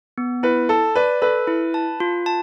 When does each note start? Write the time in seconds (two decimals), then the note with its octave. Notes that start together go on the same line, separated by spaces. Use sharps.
0.18 B3
0.43 E4 B4
0.69 A4 A5
0.95 B4 D5
1.22 A4 B4
1.47 E4
1.74 A5
2.00 F4
2.26 A5